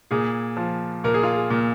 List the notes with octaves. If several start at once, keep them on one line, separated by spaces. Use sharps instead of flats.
A#2 G#4
F3
A#2 A#4
G#4
F4
G#4
A#2